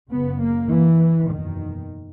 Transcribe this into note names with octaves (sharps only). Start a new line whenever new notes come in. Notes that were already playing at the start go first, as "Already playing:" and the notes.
F#1 F#2 C#3 B3
A#3
E3
F#1 E2 B2 D#3